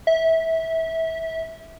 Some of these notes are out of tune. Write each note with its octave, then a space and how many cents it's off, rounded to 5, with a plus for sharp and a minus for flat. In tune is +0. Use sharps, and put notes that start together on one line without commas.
E5 -20